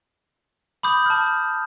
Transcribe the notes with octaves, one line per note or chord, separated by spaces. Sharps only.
B5 D6 D#6 G6
A5 F6